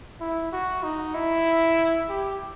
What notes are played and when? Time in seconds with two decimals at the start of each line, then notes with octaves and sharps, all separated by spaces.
0.21 E4
0.52 F#4
0.83 D#4
1.15 E4
2.09 G4